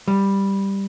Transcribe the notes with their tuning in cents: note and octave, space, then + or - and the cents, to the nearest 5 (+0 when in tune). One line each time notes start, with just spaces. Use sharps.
G3 +5